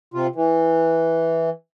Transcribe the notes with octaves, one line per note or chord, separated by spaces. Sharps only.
C3 F4
E3